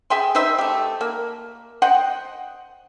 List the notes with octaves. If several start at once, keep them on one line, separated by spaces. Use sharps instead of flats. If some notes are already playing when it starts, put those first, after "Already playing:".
G#4 E5 G5 C6
D#4 B4 C5 E5
A3 G4
A#3
C5 D#5 F#5 G5